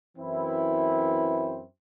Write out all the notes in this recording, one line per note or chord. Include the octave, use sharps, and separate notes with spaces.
F#2 E3 C4 E4